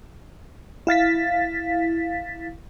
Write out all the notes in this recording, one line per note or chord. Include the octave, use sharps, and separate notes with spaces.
E4 F5 A6 B6